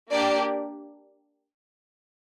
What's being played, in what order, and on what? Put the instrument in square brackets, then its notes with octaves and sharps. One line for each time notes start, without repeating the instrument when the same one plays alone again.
[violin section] A#3 D4 G4 D5